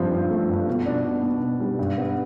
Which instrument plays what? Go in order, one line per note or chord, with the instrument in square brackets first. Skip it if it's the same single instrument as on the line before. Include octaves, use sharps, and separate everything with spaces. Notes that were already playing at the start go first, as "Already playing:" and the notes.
Already playing: [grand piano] G2 F3 C4
G2
A3
G2
B2
D4
B2
B2
B2
G3
G2
B3